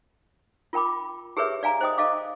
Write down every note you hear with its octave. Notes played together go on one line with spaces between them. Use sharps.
F4 A#4 G5 B5 D6
G4 G#4 A#4 B4 C#5 E5
D5 F5 G#5 A#5
C5 D#5 G5 D#6
A4 D#5 F5 D6